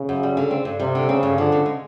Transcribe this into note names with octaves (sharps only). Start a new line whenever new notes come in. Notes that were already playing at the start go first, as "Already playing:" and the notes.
Already playing: C#3
F#2
G3
D3
C4
G2
C3 G3
D3
C#3 C4
G2
D3 F3
C#3
G#3